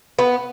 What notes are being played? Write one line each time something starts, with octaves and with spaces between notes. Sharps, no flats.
B3